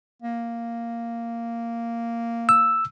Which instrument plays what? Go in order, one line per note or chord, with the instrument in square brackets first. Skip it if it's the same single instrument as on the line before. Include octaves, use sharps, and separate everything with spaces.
[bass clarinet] A#3
[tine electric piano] E6